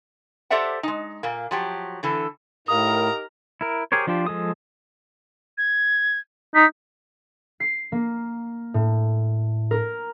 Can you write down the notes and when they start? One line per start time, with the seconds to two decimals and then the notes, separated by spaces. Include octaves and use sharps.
0.50 G4 A4 C5 D5 E5 F#5
0.83 G#3 D#4
1.23 A#2 A#3
1.51 F3 F#3 G4
2.03 D3 E3 A4
2.68 A2 D#4 G4 A#4 F5 A#5 D#6
3.61 E4 A#4
3.92 G4 G#4 A#4 C5 C#5
4.07 F3 D4 F4 G4 C5
4.27 F3 G#3 A4 D#6
5.58 G#6
6.55 D#4 B6
7.60 C7
7.92 A#3
8.74 A2
9.71 A#4